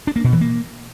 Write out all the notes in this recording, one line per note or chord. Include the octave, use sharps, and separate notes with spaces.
D4
A#3
B2
E3
A#3